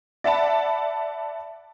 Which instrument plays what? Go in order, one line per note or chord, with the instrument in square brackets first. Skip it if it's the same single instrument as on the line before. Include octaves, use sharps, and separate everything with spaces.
[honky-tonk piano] D5 E5 F#5 A5 B5